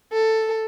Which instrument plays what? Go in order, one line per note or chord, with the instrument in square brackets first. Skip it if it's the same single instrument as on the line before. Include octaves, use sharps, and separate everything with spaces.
[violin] A4